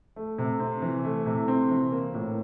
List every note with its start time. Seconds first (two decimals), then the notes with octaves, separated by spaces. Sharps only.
0.16 A3
0.38 C3
0.60 C4
0.82 E3
1.04 A3
1.26 C3
1.48 C4
1.71 E3
1.92 A#3
2.14 A2